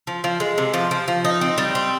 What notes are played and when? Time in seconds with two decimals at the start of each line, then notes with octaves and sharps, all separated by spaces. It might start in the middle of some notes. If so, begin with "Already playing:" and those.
0.07 F3
0.24 F3
0.40 G#3
0.58 C3
0.74 F3
0.91 F3
1.08 F3
1.25 D#4
1.41 C4
1.58 G3
1.75 C4